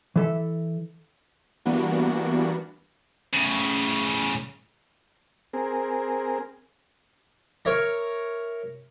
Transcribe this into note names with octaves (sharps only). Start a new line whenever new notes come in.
E3 A4 E5
E3 G3 A#3 B3 D4 F#4
A2 C#3
C4 G#4 A#4
A#4 C#5 E5 A#5